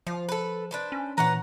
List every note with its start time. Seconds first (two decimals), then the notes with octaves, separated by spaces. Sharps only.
0.07 F3 F4
0.29 A4 B4
0.71 D4 B4 C5
0.92 C#4
1.18 A#2 E3 B4 C#5 F#5 A#5